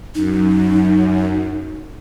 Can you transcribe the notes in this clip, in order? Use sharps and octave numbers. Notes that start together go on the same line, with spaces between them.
F#2 D#4